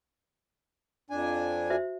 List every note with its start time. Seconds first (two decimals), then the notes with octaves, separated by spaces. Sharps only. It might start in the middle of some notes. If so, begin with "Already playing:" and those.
1.10 F2 D4 G#5
1.70 F#4 C5 E5